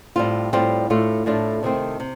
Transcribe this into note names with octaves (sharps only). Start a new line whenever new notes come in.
A2 G3 C4 F4
A2 G3 C4 F4
A2 A3 D4 F4
A2 A3 D4 F4
C3 D#3 A3 C4
C3